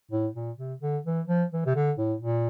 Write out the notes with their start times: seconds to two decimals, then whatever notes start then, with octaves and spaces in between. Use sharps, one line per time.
0.11 A2
0.35 A#2
0.58 C3
0.82 D3
1.05 E3
1.28 F3
1.53 E3
1.66 C3
1.76 D3
1.98 A2
2.21 A#2